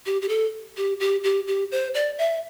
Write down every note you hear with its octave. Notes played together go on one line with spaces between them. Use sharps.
G4
G4
A4
G4
G4
G4
G4
C5
D5
E5